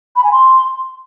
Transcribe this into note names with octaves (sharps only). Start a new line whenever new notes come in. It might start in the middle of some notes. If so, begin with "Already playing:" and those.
B5
G#5
C6